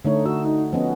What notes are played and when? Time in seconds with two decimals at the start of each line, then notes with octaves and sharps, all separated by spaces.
0.05 D3 A3 D#4 C#5
0.26 F#4 E6
0.45 D#4
0.73 F3 B3 C#4 D#5